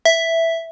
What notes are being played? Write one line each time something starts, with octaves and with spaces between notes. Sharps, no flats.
E5